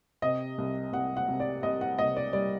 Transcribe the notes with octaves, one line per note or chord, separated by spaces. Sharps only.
C3 D#5
C2
C2 F#5
F#5
C3
D5
C2 D#5
F#5
C2 D#5
D5
G3 D5